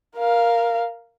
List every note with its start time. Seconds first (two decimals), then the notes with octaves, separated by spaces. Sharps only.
0.16 A#4 F5